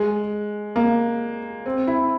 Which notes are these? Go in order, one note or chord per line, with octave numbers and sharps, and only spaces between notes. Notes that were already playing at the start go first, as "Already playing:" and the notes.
Already playing: G#3
A#3
C4
E4